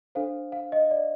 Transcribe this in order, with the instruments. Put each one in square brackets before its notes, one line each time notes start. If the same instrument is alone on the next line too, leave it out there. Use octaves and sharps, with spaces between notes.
[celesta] D4 A4 C5 F5
F5
D#5
D5